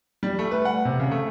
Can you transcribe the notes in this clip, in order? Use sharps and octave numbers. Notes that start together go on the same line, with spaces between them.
G3
A3
B4
F#5
C3
C#3
A3